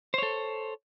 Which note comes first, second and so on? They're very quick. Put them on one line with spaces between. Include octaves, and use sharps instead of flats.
C5 C#5 A4